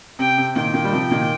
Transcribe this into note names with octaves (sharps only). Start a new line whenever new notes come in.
C3 G5
C3
A#2 D#3 G5
A#2 D#3
G3
C3 F3
A#2 D#3